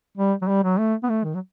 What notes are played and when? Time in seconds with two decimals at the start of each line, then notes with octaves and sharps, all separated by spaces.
0.18 G3
0.42 F#3
0.48 G3
0.63 F#3
0.79 A3
1.03 B3
1.09 A3
1.24 D#3
1.35 F#3